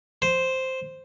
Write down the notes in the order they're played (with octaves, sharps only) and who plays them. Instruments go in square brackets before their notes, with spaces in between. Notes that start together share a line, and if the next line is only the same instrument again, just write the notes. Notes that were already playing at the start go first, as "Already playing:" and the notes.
[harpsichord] C5